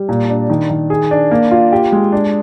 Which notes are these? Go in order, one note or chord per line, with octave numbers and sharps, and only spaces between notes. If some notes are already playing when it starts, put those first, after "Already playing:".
Already playing: G3
A#2
D4
D#3
D#3
G#4
D4
A#3
F4
G4
G#3
D4